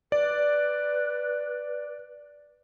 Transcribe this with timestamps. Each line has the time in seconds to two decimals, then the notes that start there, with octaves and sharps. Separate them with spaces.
0.12 B4 D5